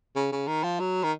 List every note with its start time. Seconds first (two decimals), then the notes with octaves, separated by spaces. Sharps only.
0.16 C#3
0.32 C#3
0.47 D#3
0.63 F3
0.80 F#3
1.03 D#3